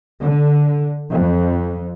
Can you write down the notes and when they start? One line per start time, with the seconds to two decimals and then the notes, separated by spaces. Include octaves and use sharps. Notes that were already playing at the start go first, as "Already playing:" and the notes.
0.20 D3
1.11 F2